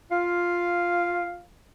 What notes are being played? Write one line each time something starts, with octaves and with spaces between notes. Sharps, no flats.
F4 F5